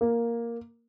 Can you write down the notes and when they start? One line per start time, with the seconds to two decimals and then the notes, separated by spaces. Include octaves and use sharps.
0.01 A#3